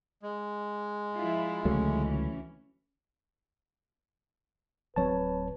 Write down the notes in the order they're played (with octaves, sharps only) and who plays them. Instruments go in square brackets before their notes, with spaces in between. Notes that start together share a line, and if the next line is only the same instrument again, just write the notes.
[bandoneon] G#3
[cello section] F3 E4 F4
[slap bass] C#2 D3 [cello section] E3 C#4 [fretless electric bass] F#3 A3
[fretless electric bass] D1 F#3 C4 [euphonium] B4 [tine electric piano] C#5 A5